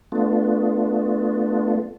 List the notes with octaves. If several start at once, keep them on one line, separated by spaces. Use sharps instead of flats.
A3 B3 D4 F4